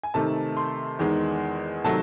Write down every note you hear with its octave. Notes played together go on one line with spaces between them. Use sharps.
G#5
C3 D#3 A3 A5
C6
E2 D#3 G#3
C3 D#3 F#3 A3 A5